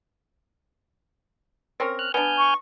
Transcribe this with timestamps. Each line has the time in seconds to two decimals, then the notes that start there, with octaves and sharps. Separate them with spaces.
1.80 C4 C#4 A#4
1.99 F6 F#6
2.14 B3 D4 G#5 F6 G6
2.38 C#6